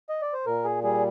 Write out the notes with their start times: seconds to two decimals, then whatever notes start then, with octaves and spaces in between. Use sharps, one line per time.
0.09 D#5
0.22 D5
0.33 C5
0.46 A#2 A#4
0.64 G#4
0.84 G3 G#4